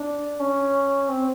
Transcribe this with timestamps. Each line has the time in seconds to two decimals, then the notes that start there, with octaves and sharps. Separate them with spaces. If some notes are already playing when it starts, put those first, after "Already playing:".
Already playing: D4
0.40 C#4
1.09 C4